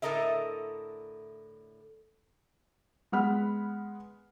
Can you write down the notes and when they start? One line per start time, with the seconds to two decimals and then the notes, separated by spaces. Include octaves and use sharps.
0.02 A2 D3 A4 A#4 D#5 E5
3.12 G#3 B3 F#5 B5 F6